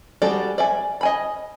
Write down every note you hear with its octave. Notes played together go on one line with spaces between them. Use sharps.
G3 G#3 F#4 A4 D5
D5 E5 G#5
D#5 G#5 B5